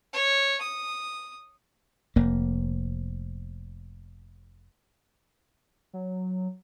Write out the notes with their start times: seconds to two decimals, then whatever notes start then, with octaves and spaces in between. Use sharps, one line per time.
0.13 C#5
0.61 D#6
2.16 F1 A#3
5.93 F#3